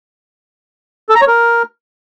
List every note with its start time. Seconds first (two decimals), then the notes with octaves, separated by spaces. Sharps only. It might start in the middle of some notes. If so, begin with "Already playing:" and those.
1.09 A4
1.15 A#5
1.21 C#5
1.27 A#4